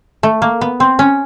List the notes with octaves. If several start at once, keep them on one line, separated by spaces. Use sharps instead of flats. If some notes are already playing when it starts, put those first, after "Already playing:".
A3
A#3
B3
C4
C#4